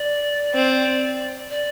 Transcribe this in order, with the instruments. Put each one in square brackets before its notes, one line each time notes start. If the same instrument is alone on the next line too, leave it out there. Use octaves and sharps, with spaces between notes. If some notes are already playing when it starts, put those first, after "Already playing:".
Already playing: [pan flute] D5
[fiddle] C4
[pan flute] D5